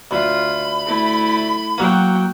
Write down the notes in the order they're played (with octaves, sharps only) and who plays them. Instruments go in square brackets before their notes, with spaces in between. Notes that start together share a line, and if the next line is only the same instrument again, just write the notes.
[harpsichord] D2 [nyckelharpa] F4 [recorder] B5
[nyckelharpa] A3 E4
[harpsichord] F#3 A#3 [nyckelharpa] F#4 G5